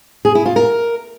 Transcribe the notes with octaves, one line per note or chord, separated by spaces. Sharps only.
G#4
E4
F4
A#4